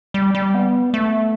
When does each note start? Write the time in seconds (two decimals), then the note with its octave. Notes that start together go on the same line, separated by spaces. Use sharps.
0.14 G3
0.35 G3
0.55 B3
0.94 A3